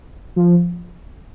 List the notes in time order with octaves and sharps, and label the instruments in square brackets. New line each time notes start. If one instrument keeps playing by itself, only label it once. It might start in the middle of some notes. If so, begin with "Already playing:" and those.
[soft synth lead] F3